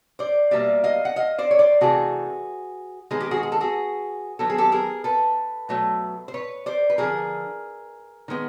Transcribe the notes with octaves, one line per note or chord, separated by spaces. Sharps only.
C5 D5
B2 G3 A#3 D5 E5
D#5 F5
F#5
D#5 F5
C5 D5
C#5
C5 D5
C3 E3 A3 F#4 G#4
D#3 G#3 B3 G#4
G4
F#4 G#4
G#4
A4
F#4 G#4
D#3 F#3 B3 A4
G#4
G4 A4
G#4 A#4
A4 B4
B2 F#3 A3
C5
B4 C#5
C5 D5
B4
D3 F3 A#3 G#4 A#4
D#3 G#3 B3